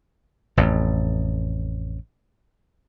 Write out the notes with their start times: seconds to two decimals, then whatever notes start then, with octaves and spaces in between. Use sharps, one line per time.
0.57 A1 F2